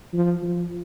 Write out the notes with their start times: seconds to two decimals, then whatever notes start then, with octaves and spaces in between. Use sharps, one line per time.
0.13 F3
0.42 F3